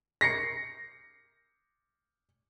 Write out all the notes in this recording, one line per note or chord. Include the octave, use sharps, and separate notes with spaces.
A#6 C7 C#7